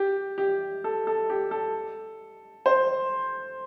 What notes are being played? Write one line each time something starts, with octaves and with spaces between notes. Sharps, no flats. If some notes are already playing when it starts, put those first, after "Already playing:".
Already playing: G4
G4
A4
A4
G4
A4
C5